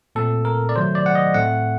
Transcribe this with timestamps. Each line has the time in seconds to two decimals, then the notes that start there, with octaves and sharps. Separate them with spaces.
0.15 A#2 A3 C4 A4
0.45 A#4
0.69 D5
0.75 C3 D#3 F#3 A3 C5
0.95 D5
1.06 F#5
1.15 D#5
1.34 A2 A3 C4 F#5